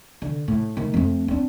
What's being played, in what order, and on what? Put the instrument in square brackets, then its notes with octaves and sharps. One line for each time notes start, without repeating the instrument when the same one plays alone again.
[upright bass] D3
A2
D#3 A3
F2 A3
C4 D4